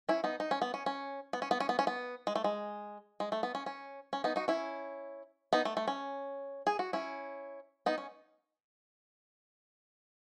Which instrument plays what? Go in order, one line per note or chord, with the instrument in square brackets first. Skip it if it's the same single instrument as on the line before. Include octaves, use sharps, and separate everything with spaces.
[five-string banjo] C#4 E4
B3 D#4
D#4
C#4
B3
C#4
C#4
B3
C#4
B3
C#4
B3
C#4
B3
G#3
A3
G#3
G#3
A3
B3
C#4
C#4
C#4
B3 D#4
D#4 F#4
C#4 E4
B3 D#4
A3
A3
C#4
G#4
F#4
C#4 E4
B3 D#4
C#4